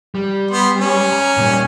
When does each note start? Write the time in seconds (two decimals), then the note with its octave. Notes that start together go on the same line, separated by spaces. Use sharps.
0.15 G3
0.51 B3 C6
0.79 C#4 G#5
1.12 A#5
1.37 A#2 G3